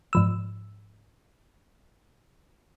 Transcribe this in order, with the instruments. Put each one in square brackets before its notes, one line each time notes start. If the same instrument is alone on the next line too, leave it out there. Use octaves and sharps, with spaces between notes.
[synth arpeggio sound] G#2 F3 E6